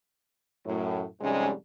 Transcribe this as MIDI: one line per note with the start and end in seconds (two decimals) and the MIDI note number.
0.66 1.04 42
0.66 1.04 45
1.21 1.51 41
1.21 1.51 44
1.21 1.51 48
1.21 1.51 55
1.21 1.51 56
1.21 1.51 61